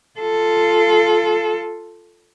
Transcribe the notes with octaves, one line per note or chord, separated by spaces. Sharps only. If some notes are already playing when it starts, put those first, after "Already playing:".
F4 A4